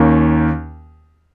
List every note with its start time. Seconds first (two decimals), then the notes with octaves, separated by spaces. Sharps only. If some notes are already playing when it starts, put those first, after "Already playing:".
Already playing: D#2 D#3 A#3 C#4